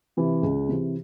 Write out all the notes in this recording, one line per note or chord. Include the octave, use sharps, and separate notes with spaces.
C3 E3
C#2
C3 E3